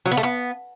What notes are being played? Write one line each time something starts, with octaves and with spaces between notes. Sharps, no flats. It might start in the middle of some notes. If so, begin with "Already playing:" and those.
F#3
B3
A3
B3